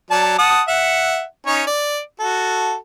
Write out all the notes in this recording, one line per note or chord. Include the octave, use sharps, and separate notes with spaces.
F#3 D5 A5
F#5 A5 D#6
E5 F#5
C#4 D#4 C#5
D5
F#4 A4